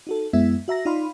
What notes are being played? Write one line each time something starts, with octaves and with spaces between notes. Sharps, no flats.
D#4 F#4 A4
F#2 G#3 B3 E4 E5
F#4 E5 A#5 A#6
D#4 F4 D5 F5 B5 C6